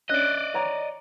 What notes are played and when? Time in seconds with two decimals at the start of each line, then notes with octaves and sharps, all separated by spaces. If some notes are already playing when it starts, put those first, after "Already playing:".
0.10 C#4 D4 D5 D#5 F#6
0.54 C#5 A#5 D6